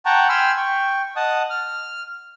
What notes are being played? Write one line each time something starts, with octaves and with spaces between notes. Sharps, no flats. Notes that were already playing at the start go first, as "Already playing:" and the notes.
F#5 G5 A5 A#5 C#6
G5 G#5 B5 C6 E6 F6
G5 C#6
D#5 F#5 A5 D#6
F6